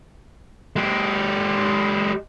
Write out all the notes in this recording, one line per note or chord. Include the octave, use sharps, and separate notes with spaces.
G#3 G4